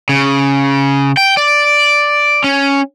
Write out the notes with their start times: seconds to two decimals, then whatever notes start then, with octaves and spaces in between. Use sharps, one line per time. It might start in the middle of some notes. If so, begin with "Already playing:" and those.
0.09 C#3
1.17 G5
1.37 D5
2.44 C#4